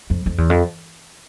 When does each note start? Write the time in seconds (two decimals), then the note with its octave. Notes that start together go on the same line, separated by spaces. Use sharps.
0.10 F2
0.26 F2
0.38 E2
0.50 F2